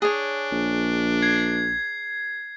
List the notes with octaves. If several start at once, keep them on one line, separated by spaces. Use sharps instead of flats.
D4 G#4 C#5
A#1
G#6 C7